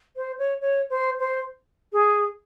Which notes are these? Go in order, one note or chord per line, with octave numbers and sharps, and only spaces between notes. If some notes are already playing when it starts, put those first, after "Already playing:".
C5
C#5
C#5
C5
C5
G#4